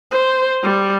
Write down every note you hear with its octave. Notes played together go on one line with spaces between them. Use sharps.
C5
G3